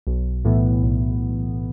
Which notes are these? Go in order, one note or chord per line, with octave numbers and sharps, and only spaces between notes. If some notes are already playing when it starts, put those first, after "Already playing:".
B1
A2 E3 B3
B1